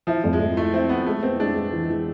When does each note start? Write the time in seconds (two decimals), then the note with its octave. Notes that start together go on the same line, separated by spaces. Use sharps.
0.07 F3 E4
0.24 F2
0.33 G#3
0.40 F2
0.57 A3 E4
0.74 C4 E4
0.89 B3 E4
1.06 G#3 A3
1.23 B3 C4
1.40 G#3 D4
1.56 G#3
1.72 E3
1.89 E3